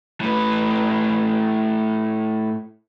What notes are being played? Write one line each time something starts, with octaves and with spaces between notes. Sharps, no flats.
A2 B4